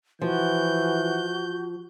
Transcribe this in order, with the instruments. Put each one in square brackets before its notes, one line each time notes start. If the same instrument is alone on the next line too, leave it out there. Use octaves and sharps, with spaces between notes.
[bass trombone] E3 [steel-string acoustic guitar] F3 [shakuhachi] F#4 [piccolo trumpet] G6